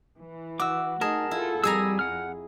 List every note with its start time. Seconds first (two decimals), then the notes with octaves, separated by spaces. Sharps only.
0.20 E3
0.60 F#4 D6 E6
1.01 A3 D#4 G#4 A#4 A5
1.31 E4 F4 A4
1.64 F2 G3 G#4 G#5 A#5 E6
1.99 F#5 F6